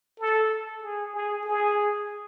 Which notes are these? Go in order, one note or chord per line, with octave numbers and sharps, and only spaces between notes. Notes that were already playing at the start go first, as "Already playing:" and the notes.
A4
G#4
G#4
G#4